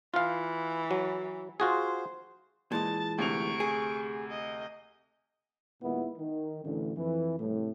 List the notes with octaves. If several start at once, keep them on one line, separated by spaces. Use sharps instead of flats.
E3 F4 F5
F#3
F4 F#4 G#4 C5
A#2 E3 G#3 A5 A6
D2 C3 C#6 D7 F7
G#4
D#5
D#2 A#2 G#3 B3 E4
D#3
A1 D2
F2 E3
C2 A2